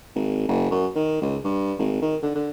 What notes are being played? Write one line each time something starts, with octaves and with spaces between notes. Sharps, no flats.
G#1
F#1
F#2
D#3
C#2
G2
G#1
D#3
D3
D3